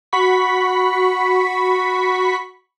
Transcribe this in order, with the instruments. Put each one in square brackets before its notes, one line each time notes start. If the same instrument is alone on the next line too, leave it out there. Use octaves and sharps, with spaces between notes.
[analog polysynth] F#4 B5 C#6 B6